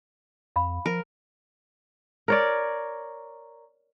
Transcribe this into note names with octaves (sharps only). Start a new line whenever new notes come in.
F2 F5 B5
F3 A#4
A#4 C#5 D5